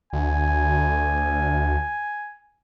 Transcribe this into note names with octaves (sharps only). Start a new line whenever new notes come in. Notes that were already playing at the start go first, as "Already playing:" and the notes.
D2 G#5